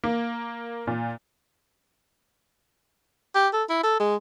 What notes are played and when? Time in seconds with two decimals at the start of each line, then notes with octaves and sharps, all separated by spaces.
0.04 A#3
0.87 A#2
3.35 G4
3.53 A4
3.69 E4
3.83 A4
4.00 G#3